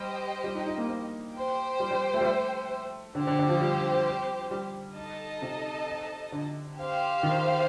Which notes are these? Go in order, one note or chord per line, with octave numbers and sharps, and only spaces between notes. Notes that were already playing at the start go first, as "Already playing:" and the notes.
Already playing: G3 G4 C5 D#5 G5
G3
D#4
D#4
A#3
A#3
G4 C5 G5
G3
G3
A3
G3
A3
D3 C4 G4 C5
D3
D3
F3
G3
G3
D#4 A4 D#5 A5
C3
D3
G4 C5 F5
D#3